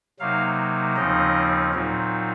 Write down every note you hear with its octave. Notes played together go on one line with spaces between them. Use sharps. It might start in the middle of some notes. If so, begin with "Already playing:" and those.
C3 F#3 A#3 D#4 F5
D#2 C#3 F3 C4 D#4 D#5
A#2 F#3 C4 D#4